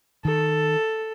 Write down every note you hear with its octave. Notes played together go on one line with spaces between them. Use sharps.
D#3 A4